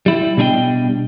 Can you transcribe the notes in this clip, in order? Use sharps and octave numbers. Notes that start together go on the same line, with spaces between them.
G3 E4
B2 G3 D4 G#4 D#5 G5